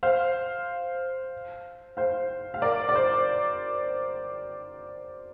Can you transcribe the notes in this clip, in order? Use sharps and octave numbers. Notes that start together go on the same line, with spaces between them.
C5 F5
C5 F5
F5
A#4 D5
D5
C5